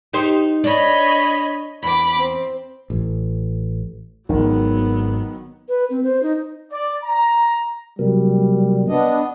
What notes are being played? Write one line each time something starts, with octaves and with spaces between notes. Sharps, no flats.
D#4 G4 C5
D4 C#5 D#5 B5
E2 B5 D6
C4
A1
G#1 D#3 F#3 B3
B4
C4
C5
D#4
D5
A#5
C3 F#3 G3 A#3
B3 D4 D#5